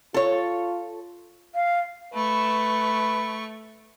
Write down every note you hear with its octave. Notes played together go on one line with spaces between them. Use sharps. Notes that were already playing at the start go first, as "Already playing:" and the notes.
F4 A4 C#5
F5
A3 B4 C#6